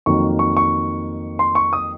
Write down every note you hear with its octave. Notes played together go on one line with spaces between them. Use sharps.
F2 D#3 F#3 A#3 C#6
C#6
C#6
C6
C#6
D#6